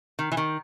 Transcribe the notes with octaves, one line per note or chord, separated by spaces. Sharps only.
D#3
E3
D#3